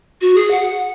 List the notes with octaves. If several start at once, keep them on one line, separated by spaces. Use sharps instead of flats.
F#4
G#4
F#5